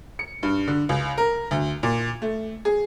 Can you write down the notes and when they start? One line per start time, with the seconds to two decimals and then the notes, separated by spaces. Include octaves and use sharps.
0.19 C#7
0.43 G2
0.68 D3
0.89 C#2
1.18 A#4
1.51 D2
1.83 A#2
2.22 A3
2.65 G#4